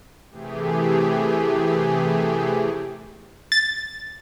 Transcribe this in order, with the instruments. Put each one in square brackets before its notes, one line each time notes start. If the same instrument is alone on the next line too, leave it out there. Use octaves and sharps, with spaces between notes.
[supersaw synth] C3 E3 A3 G4 G#4
[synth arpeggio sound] A6